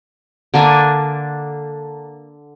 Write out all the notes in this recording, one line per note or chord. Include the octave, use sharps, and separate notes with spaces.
D3 A#3 D4 G#5